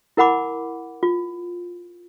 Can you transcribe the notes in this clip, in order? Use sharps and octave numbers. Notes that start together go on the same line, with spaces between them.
E4 A#4 F#5 B5 D6
F4